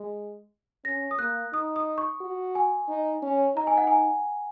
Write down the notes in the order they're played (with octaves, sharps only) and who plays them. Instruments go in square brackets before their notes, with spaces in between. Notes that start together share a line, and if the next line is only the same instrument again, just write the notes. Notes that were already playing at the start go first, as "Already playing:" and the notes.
Already playing: [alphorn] G#3
[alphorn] C#4 [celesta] A#6
[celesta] D#6
[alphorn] A#3 [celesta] F#6
[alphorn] D#4 [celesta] D#6
[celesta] D#6
C#6
[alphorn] F#4
[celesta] G#5
[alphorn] D#4
C#4
[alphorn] D#4 [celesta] A#5
[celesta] G#5
F#5
G#5